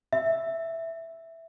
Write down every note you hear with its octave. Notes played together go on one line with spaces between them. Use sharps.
E5